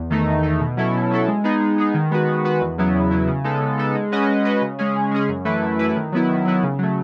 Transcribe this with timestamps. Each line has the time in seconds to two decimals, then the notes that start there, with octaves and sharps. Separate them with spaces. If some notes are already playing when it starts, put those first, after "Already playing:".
Already playing: E2
0.10 D#3 A3 D#4
0.27 E2
0.43 D#3 A3 D#4
0.60 B2
0.77 F#3 C#4 E4 A4
0.94 B2
1.10 F#3 C#4 E4 A4
1.28 G#3
1.44 B3 D#4 G#4
1.60 G#3
1.78 B3 D#4 G#4
1.94 D#3
2.11 G#3 B3 F#4 B4
2.28 D#3
2.44 G#3 B3 F#4 B4
2.61 E2
2.78 C#3 F#3 B3 E4
2.95 E2
3.11 C#3 F#3 B3 E4
3.28 C#3
3.44 G#3 B3 D#4 A4
3.62 C#3
3.78 G#3 B3 D#4 A4
3.95 G#3
4.12 C#4 F#4 B4 D#5
4.28 G#3
4.45 C#4 F#4 B4 D#5
4.61 C#3
4.79 G#3 C#4 G#4
4.96 C#3
5.11 G#3 C#4 G#4
5.29 F#2
5.45 E3 A3 E4 B4
5.62 F#2
5.79 E3 A3 E4 B4
5.96 D#3
6.12 F#3 B3 E4
6.29 D#3
6.45 F#3 B3 E4
6.63 C#3
6.79 F#3 A3